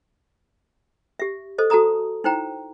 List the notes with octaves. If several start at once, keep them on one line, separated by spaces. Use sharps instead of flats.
G4 E5
A4 C5 D#5
F#4 A4 A5 A#5 D#6
D#4 E4 C5 G5 A#5